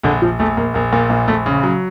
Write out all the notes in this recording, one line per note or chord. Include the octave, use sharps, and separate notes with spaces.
A#1 D3
A#1 F3
A#1 A3
A#1 A#3
A#1 A#3
A#2 A#3
A#1 A#3
A#1 A3
C#3
F#3